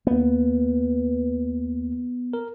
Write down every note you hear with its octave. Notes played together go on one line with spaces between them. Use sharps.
D#2 A#3 B3
A#4